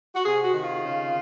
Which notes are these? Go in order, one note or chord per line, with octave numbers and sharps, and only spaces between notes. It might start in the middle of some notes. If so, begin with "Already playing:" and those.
F#4
C3 G#4
F#4
D#3
F4
C#3